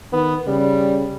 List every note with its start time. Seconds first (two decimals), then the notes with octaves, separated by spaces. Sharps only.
0.13 D#3 B3
0.47 C#3 G3